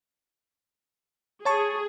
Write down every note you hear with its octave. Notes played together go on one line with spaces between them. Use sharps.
G#4 C#5 A5 C#6